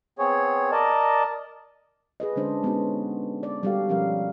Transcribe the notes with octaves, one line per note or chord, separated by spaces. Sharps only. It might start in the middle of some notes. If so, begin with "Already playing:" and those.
B3 C4 G#4 C#5
A#4 D5 D#5 A5
G#4 B4 D#5
D3 G#3 C#4 D4 C5
G#3 B3 C#4 D#4 F#4
D5
G3 F#4 G4 A4 F5
B2 F3 C#4 G4 A#4 F5